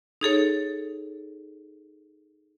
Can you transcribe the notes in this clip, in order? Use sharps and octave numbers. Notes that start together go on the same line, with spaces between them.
D#4 G#4 A4 C#5